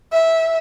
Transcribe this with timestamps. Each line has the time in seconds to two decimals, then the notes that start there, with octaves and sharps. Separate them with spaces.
0.12 E5